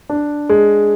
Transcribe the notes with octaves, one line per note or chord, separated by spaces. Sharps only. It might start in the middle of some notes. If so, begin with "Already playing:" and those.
D4
G#3